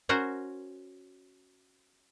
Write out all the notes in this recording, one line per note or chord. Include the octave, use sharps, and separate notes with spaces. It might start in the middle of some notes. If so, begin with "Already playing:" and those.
C#4 F#4 A#4 C5